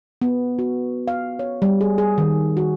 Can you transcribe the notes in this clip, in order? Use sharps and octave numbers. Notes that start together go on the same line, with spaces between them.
B3
F#4
F5
C#5
G3
G#4
G#4
D#3
F#4